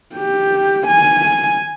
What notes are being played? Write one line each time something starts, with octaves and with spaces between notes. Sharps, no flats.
G4
G#5